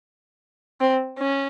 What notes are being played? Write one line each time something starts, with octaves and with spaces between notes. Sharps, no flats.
C4
C#4